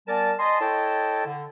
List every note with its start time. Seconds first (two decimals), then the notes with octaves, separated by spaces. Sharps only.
0.07 G3 B3 A#4 D5 G#5 A5
0.38 D#5 G#5 A5 C6
0.60 E4 A4 C#5 D#5 G5 A5
1.25 D3